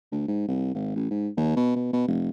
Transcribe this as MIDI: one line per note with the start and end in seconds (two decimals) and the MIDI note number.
0.12 0.23 38
0.28 0.47 44
0.48 0.74 36
0.74 0.91 32
0.95 1.09 33
1.11 1.28 44
1.37 1.52 39
1.56 1.75 47
1.76 1.88 47
1.93 2.04 47
2.08 2.30 29